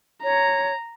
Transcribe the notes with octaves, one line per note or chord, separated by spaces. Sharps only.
C#5 A#5